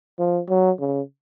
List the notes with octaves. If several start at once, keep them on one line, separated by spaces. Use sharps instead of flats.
F3
F#3
C#3